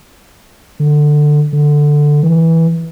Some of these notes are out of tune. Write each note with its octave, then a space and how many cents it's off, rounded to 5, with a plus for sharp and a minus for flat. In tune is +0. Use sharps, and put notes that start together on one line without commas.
D3 +15
D3 +5
E3 -10